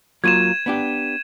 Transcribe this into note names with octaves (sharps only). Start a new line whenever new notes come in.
F#3 A#3 F4 G#6 D#7 E7
B3 D4 G4